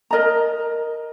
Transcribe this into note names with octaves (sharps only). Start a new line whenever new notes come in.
A#4 D#5 A#5